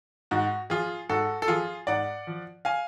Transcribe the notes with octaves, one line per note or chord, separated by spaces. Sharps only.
G#2 F#4
F3 F4 G#4
G#2 F#4 A4
A4
F3 F4 G#4
G#2 D5 F#5
F3
F5 G#5